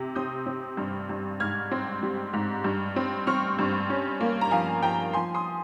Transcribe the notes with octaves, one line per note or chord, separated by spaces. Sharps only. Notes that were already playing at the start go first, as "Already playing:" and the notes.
Already playing: C3
C4 D#6 G6
C4
G2
G2
G#2 F6 G#6
C4
G3
G#2
G2
C4
C4 C#6 F6
G2
C#4
A#3
A#5
F3 F5 G#5
F3 G5 A#5
F3 G#5 C6
C6 D#6